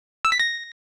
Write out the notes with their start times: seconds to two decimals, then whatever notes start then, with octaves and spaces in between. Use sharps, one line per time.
0.25 E6
0.32 B6
0.39 A#6